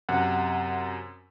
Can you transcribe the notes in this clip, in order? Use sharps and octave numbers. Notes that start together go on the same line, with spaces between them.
F#2 C3 F#5